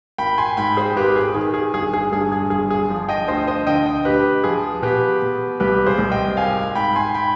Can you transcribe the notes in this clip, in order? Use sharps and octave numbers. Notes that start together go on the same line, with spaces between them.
G#1 G5 B5
G#5 C6
G#2 G5 B5
G#4 C5
G#1 G4 B4
G#4
D#3 G#4
G#4
G1 G#4
G#4
G2 G#4
G#4
G1 G#4
G#4
F3
D#5 G5
D2 C5 D#5
C5 D#5
D3 D#5 G5
D#5 G5
D2 G4 B4
F3 G#4
B2 G4 B4
B2
C2 G4 B4
G#4 C5
C2
D#5 G5
G#1 F5 G#5
G#2 G5 B5
G#5 C6
G5 B5